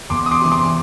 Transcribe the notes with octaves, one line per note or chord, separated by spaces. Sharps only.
E2 C6 D6
D#6
C6 D6
C3 E3
C6 D6